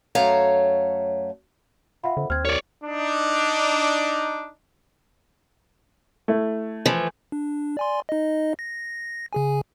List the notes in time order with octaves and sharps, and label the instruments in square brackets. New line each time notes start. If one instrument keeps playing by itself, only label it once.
[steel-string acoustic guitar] F#2 A3 C#5 F5 A5 A#5
[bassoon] F4 [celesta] E5 F#5 B5
[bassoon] F2 [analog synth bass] D3
[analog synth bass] D#2 [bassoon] C4 [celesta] F6 G#6
[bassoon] C2 [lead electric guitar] C#5 D5
[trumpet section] D4 D#4
[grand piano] A3 E4
[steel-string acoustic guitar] E3 F3
[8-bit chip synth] D4
D5 G#5 C6
D#4 D#5
A#6
C#3 G#4 G#5